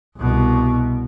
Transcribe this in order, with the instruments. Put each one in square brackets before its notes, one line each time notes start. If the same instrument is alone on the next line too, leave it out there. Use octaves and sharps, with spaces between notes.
[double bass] C2 B2